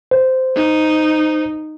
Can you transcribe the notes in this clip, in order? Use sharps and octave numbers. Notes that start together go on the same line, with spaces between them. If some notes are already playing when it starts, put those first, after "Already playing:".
C5
D#4